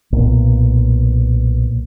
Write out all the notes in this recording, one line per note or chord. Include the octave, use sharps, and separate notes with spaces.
B1 A#2